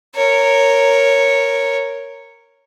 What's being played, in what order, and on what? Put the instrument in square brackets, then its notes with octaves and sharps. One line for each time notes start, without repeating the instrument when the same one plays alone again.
[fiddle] A#4 C#5